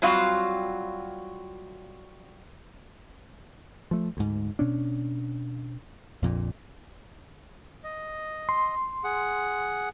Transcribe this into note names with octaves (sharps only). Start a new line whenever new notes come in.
F#3 G3 C4 F4 F#4 F5
F3 A3
D2 G#2
B2 C#4 D4
A#1 F2 A#2
D#5
C6
G#4 F#5